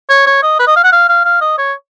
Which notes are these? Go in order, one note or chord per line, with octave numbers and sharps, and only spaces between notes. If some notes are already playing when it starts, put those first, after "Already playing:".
C#5
C#5
D#5
B4
D#5
F5
F#5
F5
F5
F5
D#5
C#5